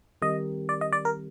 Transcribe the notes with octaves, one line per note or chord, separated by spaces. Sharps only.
D#3 G3 C4 G4 A#4 D#5
D5
D#5
D5
A#4